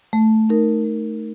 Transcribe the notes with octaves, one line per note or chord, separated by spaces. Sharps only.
A3
D#4 A#4
A3